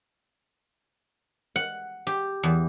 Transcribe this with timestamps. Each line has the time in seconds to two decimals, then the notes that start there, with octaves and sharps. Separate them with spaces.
1.56 F#5
2.07 G4
2.43 E2